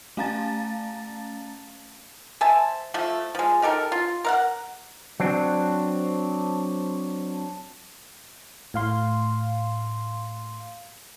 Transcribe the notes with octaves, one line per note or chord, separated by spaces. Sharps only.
A3 C#4 F5 A5 A#5 A6
C5 E5 G#5 A5
F3 A3 E5
F3 G#3
D#4 G4 A4 A#4
F4
A#4 F5 F#5
F#3 C4 D4
A2 F5 C6